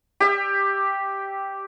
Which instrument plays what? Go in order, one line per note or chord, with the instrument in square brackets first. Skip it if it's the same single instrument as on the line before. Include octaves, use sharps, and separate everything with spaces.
[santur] G4 E5